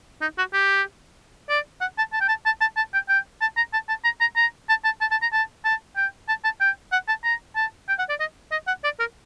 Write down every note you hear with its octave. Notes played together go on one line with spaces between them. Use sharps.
D#4
F#4
G4
D5
F#5
A5
A5
G5
A5
A5
A5
A5
G5
G5
A5
A#5
A5
A5
A#5
A#5
A#5
A5
A5
A5
A5
A#5
A5
A5
G5
A5
A5
G5
F#5
A5
A#5
A5
G5
F#5
D5
D#5
D#5
F#5
D5
A#4